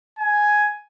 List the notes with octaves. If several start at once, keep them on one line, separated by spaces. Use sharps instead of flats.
G#5